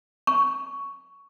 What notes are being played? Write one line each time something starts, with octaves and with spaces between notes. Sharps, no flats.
C#6